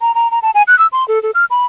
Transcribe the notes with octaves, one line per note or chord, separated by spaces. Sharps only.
A#5
A#5
A#5
A5
G#5
F#6
E6
C6
A4
A4
F6
B5